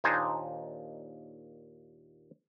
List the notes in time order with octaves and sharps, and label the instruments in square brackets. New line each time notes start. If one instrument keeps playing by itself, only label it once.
[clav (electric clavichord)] D#2 A#2 D4 D#4 C5 G#5